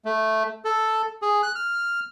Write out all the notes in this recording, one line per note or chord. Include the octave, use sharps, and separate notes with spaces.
A3
A4
G#4
F#6
F6